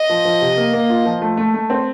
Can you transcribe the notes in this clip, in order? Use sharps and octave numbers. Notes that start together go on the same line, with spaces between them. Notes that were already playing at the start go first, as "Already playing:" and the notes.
Already playing: D#5
F3
F3
C3
A#3
A#3
F4
F3
A3
A3
A3
C4